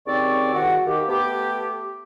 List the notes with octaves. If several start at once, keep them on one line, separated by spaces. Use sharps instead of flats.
D#2 C#3 C4 D5 C#6
C2 G#2 D#3 F#4 F#5
D#3 A#3 G4
A3 B3 G4